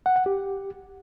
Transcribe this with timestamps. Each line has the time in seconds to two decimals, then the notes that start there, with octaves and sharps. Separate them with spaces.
0.06 F#5
0.16 F#5
0.26 G4